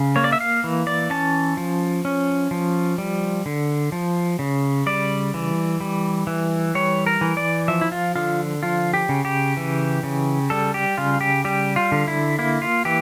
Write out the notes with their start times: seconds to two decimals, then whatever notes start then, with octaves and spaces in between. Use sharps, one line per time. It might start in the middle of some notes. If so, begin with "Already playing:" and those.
Already playing: C#3
0.16 A#3 C#5
0.24 D5
0.32 E5
0.41 F5
0.64 E3
0.87 D5
1.10 C#4 A5
1.57 F3
2.05 C#4
2.51 F3
2.98 G3
3.46 D3
3.92 F3
4.39 C#3
4.86 G3 D5
5.34 E3
5.80 G3
6.27 E3
6.75 G3 C#5
7.07 A#4
7.21 E3
7.37 D5
7.68 F3 E5
7.81 E4
7.92 F4
8.16 D3 F4
8.63 F3 F4
8.94 G4
9.09 C#3
9.25 G4
9.57 E3
10.03 C#3
10.50 G3 A4
10.74 G4
10.98 C#3 F4
11.21 G4
11.45 G3 G4
11.76 F4
11.92 D3
12.08 E4
12.39 A#3 E4
12.62 F4
12.85 E3 G4